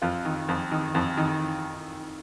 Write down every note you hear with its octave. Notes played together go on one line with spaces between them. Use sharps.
F2 F4
D#3
F2
D#3
F2
D#3